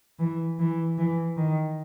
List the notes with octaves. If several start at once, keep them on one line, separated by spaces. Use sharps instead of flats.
E3
E3
E3
D#3